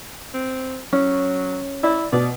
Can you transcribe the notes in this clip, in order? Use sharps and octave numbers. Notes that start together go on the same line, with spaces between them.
C4
F#3 C#4
E4 D5
B2 D5